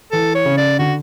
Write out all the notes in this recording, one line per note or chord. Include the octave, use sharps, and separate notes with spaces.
E3 A4
C#5
C#3
D5
D3 F#4